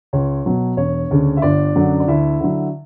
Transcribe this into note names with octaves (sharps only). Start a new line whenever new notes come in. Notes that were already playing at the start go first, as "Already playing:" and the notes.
C#2 C#5
B2 F#3
E1 C#5
D2 C#3
E5
G1 D4 D5
F#2 D3 F#3
D5
D2 E4 E5
D3 F#3